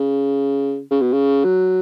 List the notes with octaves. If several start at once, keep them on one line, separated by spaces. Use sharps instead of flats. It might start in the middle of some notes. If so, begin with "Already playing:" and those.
Already playing: C#3
C#3
B2
C#3
F#3